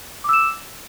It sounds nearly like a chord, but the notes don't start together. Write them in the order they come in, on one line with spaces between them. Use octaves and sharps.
D6 E6 E7